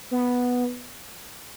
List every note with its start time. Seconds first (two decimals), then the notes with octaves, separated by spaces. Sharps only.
0.11 B3